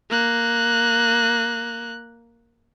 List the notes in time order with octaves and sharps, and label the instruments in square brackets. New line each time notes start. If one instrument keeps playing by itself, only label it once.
[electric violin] A#3 F#6